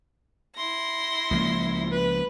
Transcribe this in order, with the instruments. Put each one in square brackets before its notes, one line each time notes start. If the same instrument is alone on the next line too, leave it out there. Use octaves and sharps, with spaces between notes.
[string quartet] E4 C6 A#6
[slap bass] C#2 F3 A#3
[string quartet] B4